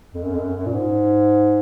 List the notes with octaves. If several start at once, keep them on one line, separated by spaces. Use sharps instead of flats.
F2
F#2
F2
F#2
F#2
A#2
G#2